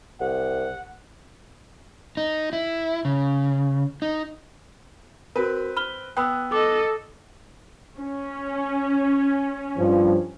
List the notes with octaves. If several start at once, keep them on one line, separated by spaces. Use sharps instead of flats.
C2 F#5
D#4
E4
C#3
D#4
C4 F#4 A#4 B4
B5 F6 G7
B3 G5 B5 D#6 E6 F#6
A4 D#5 D6
C#4
G2 F3